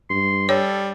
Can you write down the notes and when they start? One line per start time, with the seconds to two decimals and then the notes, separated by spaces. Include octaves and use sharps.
0.10 G2 C6
0.49 G3 A4 C#5